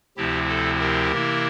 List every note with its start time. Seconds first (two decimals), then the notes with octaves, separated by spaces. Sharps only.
0.17 D2 C3 F3 C4 E4 G4
0.49 A4
0.80 G4 A#4
1.11 C3 E3 A#3 E4